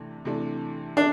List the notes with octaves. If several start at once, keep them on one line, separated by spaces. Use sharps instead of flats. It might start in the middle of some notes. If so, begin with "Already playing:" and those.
Already playing: C3 E3 A3 D4
C3 E3 A3 D4
D4